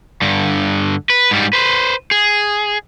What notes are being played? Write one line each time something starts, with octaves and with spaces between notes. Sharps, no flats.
G2 D3
B4
G#2 G3
B4 C5
G#4